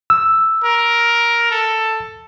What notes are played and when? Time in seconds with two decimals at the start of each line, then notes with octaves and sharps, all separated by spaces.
0.10 E6
0.64 A#4
1.51 A4